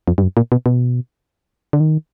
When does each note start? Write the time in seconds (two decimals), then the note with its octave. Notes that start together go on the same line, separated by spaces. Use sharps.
0.08 F2
0.18 G2
0.23 F#2
0.37 A#2
0.52 B2
0.66 B2
1.73 D3
1.80 D#3